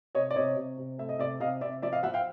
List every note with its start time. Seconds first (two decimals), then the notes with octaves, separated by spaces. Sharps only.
0.15 C3 C#5 D#5
0.31 D5
0.36 C3 C#5 D#5
0.56 C3
0.78 C3
0.98 A3 E5
1.09 D#5
1.19 C3 D5 E5
1.40 C3 D#5 F5
1.61 C3 D5 E5
1.82 F3 D5 E5
1.92 D#5 F5
2.03 F3 E5 F#5
2.14 F5 G5